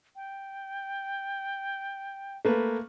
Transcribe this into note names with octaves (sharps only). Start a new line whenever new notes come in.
G5
A3 A#3 B4